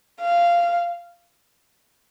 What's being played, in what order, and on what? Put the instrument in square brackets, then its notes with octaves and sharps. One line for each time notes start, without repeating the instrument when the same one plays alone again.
[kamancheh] F5